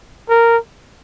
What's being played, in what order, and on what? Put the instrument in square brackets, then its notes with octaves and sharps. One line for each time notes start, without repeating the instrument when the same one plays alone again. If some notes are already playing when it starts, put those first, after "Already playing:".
[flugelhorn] A#4